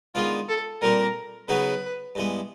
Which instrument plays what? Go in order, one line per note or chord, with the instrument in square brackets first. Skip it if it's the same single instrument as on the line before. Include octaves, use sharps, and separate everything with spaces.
[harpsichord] D#3 G#3 B3 D4 [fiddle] F4
[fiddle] A4
[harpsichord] A#2 G3 C4 [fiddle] A#4
[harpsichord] C#3 F#3 B3 D#4 F#4 [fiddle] B4
[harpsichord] G2 E3 G#3 B3